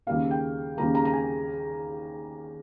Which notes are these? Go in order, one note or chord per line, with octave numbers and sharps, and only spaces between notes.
D#2 C#3 G3 A#3 F5
G5
D#2 C#3 G3 A#3 A#5
A#5
A#5
G#5